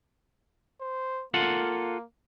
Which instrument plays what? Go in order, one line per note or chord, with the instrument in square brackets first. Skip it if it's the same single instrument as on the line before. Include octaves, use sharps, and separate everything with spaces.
[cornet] C5
[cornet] A#3 [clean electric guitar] F4 A4 F#5